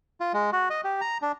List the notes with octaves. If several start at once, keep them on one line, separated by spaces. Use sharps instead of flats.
F4
G#3
F#4
D#5
G4
A#5
D4